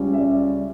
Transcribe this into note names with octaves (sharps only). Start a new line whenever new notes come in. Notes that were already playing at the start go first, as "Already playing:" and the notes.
Already playing: C#2 C#3 G3 C#4
E5
D5